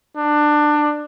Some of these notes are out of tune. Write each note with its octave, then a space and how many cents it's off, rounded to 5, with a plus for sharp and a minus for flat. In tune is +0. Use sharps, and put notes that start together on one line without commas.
D4 +20